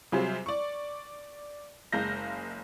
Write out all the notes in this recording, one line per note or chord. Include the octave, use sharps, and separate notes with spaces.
C3 F#3 G3 F4 G#4 C5
D5 C#6
F#1 G#3 F5 G6 A#6